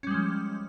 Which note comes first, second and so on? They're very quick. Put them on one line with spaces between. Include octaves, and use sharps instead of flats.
C#4 G3 G#3 F3